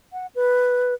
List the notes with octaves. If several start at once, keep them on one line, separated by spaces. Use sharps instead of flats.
F#5
B4